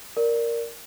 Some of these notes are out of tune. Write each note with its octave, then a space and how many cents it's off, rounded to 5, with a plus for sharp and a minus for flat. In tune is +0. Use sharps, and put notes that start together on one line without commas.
A#4 +0 D5 +0